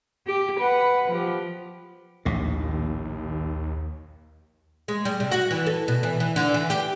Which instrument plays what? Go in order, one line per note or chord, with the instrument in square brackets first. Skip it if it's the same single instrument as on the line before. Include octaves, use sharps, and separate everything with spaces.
[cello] G4
B4 F#5
F3 G4
[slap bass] A#1 A2 [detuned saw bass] D#2
[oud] G#3
G3
C3
F#4
E3
A4
B2
E3
E3
D3
E3
G4